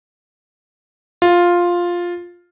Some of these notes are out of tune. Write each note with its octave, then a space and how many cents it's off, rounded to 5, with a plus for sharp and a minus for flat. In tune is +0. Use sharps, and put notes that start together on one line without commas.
F4 +5